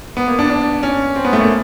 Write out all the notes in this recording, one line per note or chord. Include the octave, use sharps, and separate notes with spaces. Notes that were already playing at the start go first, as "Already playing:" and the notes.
B3
A#3
D4
D4
C#4
C4
B3
A3
A#3